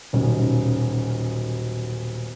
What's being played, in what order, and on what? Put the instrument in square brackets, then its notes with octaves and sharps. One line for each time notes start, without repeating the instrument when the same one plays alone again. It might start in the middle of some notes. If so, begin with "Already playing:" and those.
[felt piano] D#1 B1 C#4